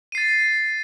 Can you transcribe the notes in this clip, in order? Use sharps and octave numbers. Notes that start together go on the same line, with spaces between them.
A6 C7 D#7